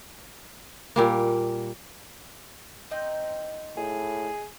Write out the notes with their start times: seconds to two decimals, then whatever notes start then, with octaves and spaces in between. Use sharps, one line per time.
0.96 A#2 G3 A#3
2.91 C4 D#4 G5
3.77 A2 G#4